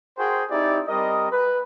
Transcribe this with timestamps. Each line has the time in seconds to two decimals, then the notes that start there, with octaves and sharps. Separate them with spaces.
0.18 F#4 G#4 A#4 C5 G5
0.50 C4 D#4 E4 G4 D5
0.88 G3 C4 A#4 D#5
1.31 B4